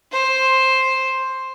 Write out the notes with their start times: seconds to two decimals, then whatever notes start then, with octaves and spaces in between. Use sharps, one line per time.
0.11 C5